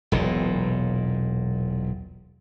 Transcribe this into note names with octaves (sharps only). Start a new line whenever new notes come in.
E1 B1 A#2